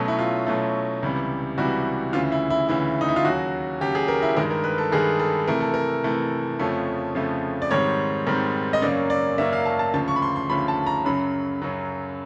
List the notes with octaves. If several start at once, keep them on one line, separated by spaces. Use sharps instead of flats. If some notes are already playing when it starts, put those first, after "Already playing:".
Already playing: B2 F#3 A3 C#4
E4
F4
B2 F#3 A3 C#4
C#2 C3 E3 G3
C#2 C3 E3 G3 F#4
D2 C#3 E3 F4
E4
E4
D2 C#3 E3 E4
D#4
E4
F4
D#2 C#3 F#3 F#4
D#2 C#3 F#3 G4
G#4
A#4
E4
G2 D#3 G#3 A#4
A#4
B4
A4
G2 D#3 G#3 G#4
A4
C3 E3 A3 A#4
A4
A#4
C3 E3 A3
F2 C#3 F3 A3 C#4
F2 C#3 F3 A3 C#4
D5
G#2 D#3 G3 C4 C#5
G#2 D#3 G3 C4
D#5
F#2 C#3 F#3 A#3 C#4 D5
D5
F#2 C#3 F#3 A#3 C#4 E5
F5
A5
A5
D2 C#3 F3 A5
C#6
B5
C6
C6
D2 C#3 F3 B5
A5
A#5
F#2 C#3 F#3 B5
F#2 C#3 F#3